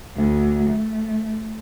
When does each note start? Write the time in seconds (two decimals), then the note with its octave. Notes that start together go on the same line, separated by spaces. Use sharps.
0.15 D2
0.70 A3